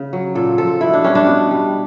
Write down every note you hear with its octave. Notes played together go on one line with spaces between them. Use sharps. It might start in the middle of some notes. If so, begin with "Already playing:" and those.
Already playing: C#3
F#3
A#2 A4
F3 A4
B2 E4
D4
G3 C#4
D4
B2
G3